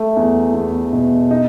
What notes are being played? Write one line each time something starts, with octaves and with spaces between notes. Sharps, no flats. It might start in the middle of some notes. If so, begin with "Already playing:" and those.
Already playing: A3
E2
E2
B2
D#4